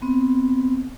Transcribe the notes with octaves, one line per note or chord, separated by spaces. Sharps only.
B3 C4